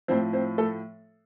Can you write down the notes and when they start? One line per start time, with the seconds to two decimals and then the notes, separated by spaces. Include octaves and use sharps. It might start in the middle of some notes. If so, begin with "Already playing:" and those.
0.08 A2 F3 C4 C5
0.33 C4 C5
0.58 A3 A4